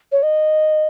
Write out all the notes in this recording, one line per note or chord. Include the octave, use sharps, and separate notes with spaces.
C#5
D#5